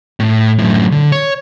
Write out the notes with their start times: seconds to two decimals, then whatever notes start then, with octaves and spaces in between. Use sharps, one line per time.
0.20 A2
0.59 F#2 A2
0.92 D3
1.12 C#5